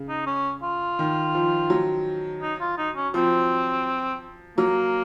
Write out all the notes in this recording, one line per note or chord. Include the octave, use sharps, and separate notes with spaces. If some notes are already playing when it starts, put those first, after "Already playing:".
Already playing: C#3
D#4
C#4
F4
D#3
F3
F#3
D#4
F4
D#4
C#4
F3 C4
F#3 A#3